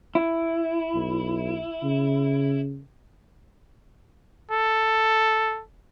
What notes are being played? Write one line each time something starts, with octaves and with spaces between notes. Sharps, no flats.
E4
B1
C#3
A4